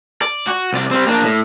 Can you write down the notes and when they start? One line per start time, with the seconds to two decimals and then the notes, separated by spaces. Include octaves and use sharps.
0.22 D5
0.47 F#4
0.73 C2 D5
0.91 G3 C4
1.07 A#3 D4
1.24 A2